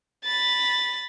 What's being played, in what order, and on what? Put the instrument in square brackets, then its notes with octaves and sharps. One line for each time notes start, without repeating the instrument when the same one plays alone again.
[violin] B5 A6